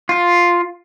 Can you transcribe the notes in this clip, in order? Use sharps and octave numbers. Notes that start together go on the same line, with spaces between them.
F4